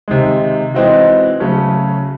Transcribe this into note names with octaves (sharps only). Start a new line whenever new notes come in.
C3 D#3 G#3
E3 G#3 C4 D#4 F#4
C#3 F#3 A3 C#4